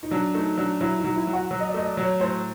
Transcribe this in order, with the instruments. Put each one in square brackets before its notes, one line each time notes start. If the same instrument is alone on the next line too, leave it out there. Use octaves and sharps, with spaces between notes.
[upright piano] D#4
[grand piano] F#3 [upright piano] D4
[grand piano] A3 [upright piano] D#4
[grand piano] F#3 [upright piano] D4
[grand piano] F#3 [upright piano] E4
[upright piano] D#4
[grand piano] F#3
[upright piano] E4
[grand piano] F#3
[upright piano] F#4
[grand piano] F#3
[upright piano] D#5
D5
[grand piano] A3 [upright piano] D#5
[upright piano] D5
[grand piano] F#3
[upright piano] C#5
[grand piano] A2 [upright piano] C5